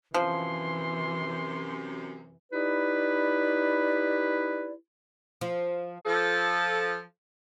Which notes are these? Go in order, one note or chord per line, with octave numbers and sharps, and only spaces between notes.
F#2 C3 E3 F3 C6
D#4 E4 G4 B4 D5
F3
F3 A4